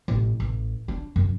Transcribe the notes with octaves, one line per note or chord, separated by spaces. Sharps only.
A1
A1
D4
F#2